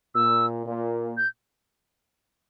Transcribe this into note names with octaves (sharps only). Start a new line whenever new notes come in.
A#2 E6
A#2
G6